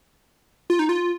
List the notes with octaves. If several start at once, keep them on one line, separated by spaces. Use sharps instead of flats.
F4
D#4
F4